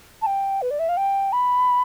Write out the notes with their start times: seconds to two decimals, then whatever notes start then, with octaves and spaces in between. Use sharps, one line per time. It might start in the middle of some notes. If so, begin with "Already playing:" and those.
0.22 A5
0.26 G5
0.62 B4
0.71 D5
0.79 E5
0.89 F5
0.97 G5
1.32 B5